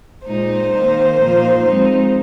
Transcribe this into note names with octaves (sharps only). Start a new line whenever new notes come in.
A#2 G#3 D#4 C5
D#3 A#3 D#4
A#2 F3 A#3 D#4
F3 G#3 C4 D#4